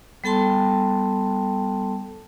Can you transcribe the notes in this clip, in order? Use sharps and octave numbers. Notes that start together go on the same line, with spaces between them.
G3 B3 A4 G5 A5 C6